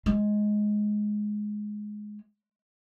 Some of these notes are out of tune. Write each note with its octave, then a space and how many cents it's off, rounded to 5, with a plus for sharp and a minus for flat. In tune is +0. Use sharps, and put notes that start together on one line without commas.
G#3 +10